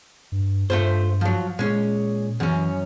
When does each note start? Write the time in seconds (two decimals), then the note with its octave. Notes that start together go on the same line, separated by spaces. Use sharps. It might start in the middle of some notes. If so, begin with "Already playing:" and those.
0.32 G2
0.70 G2 A3 F4 C5
1.21 F3 F#3
1.59 A#2 G#3 C#4
2.40 F#2 E3 C#4